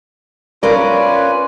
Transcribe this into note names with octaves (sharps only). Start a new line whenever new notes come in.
C#4 F4 A#4 B4 D5 G#5